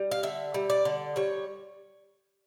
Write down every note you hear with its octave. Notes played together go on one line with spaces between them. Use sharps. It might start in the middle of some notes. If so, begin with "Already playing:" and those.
Already playing: G3
F5
D3 E5
G3
D5
D3
G3 C#5